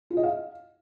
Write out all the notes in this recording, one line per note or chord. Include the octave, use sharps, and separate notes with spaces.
F4
D#5
F5